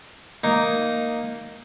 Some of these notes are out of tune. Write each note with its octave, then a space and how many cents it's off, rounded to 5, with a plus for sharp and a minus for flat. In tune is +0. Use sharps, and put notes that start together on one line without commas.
A#3 +0 D#4 +0